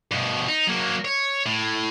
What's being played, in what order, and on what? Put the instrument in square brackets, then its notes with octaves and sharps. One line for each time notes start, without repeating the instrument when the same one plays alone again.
[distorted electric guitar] G2 B2
D#4
F#3 A#3
C#5
A2